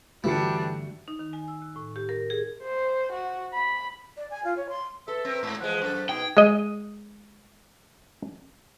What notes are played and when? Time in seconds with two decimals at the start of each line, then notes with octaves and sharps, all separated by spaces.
0.24 G2 D3 E3 G3 A3 D4 F#4 C#7
1.08 D#4
1.19 D#3
1.33 G#5
1.48 E6
1.62 F#6
1.76 A2
1.96 G4
2.09 A#4
2.30 G#4
2.63 C5
3.13 F#4
3.54 B5
4.17 D5
4.31 G#5
4.45 F4
4.57 C#5
4.70 C6
5.08 A4 B4 E5
5.25 C4 A#4
5.43 G#2
5.60 E3 F3 G#3 C5 F#5
5.82 F#2 A4
6.09 B2 D#4 G#4 G5
6.37 G#3 D#5